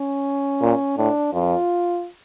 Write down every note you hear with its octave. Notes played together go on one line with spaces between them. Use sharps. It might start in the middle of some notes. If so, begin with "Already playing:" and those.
Already playing: C#4
A#2
A2 D4
F2 F4